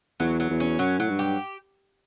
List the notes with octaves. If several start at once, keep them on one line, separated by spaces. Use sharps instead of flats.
E2 F#3
F#3
E2
C#4
F#2 F#3
A2 F#3
G2
G4